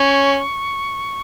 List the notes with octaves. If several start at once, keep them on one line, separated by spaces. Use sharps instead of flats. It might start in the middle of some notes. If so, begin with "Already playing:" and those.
Already playing: C#4 C#6